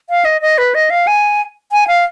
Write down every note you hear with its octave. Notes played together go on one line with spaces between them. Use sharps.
F5
D#5
D#5
B4
D#5
F5
G#5
G#5
F5